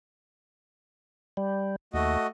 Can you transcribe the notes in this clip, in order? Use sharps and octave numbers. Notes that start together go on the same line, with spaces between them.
G3
D#2 A3 F#4 D#5